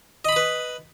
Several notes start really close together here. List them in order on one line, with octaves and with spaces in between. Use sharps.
D#5 B5 D#6 B4